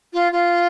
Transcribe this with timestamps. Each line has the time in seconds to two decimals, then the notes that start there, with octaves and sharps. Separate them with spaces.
0.13 F4
0.32 F4